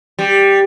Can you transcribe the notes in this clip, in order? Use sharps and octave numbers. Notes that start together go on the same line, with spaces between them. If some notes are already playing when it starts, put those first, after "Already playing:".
G3